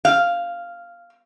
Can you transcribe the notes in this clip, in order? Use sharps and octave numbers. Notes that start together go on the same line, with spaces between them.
F5